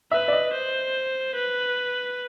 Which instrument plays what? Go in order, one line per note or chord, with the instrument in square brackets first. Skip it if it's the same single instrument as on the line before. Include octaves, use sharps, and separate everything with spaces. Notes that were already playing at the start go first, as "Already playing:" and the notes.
[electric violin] B4 [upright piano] E5
[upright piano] D5
D#5
[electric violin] C5
B4